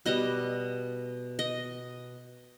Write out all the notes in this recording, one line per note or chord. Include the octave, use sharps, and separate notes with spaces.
B2 G3 B3 D#5
D#5